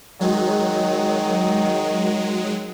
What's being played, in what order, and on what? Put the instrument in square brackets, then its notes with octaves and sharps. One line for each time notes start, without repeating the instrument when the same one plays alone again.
[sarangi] D#3 [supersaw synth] F#3 G#3